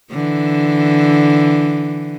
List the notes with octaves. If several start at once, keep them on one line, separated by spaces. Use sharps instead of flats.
D3 E3